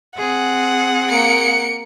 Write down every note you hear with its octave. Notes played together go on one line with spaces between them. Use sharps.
C4 G#4 F#5
A#3 C#7 D7